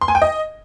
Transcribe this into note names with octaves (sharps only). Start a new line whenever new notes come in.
C6
G#5
G5
D#5